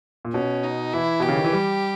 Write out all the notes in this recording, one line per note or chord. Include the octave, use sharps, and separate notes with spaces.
A#2
B2 C#4
D#4
E3 E4
B2 G4
C#3
D#3
E3
G3